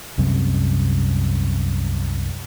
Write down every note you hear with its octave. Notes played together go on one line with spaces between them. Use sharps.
C2 F#2 C3